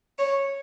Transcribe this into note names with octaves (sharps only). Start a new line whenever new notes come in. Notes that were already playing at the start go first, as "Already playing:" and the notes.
C#5